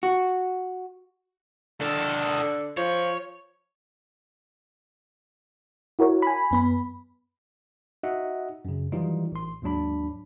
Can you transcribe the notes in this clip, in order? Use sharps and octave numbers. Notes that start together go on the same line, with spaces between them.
F#4
D3 D#3 A4
F3 C#5
E4 F#4 A#4 C#5
G#5 B5
F#2 B3 B5
D#4 F#4 D#5 E5 F#5
F#2 C#3
D#3 E3 F#3 G3 D#4 F4
A1 C6
D#2 G#2 F#3 D4 B5